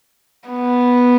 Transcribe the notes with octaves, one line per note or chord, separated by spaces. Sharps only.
B3